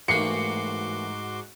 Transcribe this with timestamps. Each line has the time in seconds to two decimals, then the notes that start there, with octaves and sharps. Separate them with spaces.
0.08 A1 G#2 A#3 F#4 C6 D6 C7 C#7